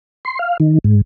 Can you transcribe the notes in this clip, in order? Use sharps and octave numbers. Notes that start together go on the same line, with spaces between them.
C6
F5
D#3
G#2